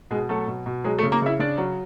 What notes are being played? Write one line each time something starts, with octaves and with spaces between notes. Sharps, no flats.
B2 G#3 G#4
F#3 A3 A4
B2
B2
F#3 G#3 G#4
A3 A4
C#3
A#3 A#4
C#3 E4 E5
C#3 D4 D5
F#3